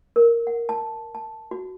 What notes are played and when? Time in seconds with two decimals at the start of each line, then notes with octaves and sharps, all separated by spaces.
0.16 A#4
0.47 F#5
0.69 A5
1.15 A5
1.51 F#4